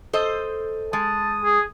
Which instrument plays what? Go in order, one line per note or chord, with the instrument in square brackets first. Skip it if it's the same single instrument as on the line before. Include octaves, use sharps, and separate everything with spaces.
[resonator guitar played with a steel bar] A4 C5 D#5
[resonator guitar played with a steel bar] G#3 [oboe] A5 [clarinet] D#6
[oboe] G#4